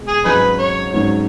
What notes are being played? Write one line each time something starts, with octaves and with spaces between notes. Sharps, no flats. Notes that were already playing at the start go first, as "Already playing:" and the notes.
Already playing: B2 G#3
G#4
G#1 G#2 F#3 C#4 D#4 G#4 B4
C#5
G#1 G#2 F#3 C#4 C#5